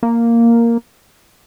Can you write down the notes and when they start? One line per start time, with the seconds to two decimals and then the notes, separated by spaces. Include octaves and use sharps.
0.03 A#3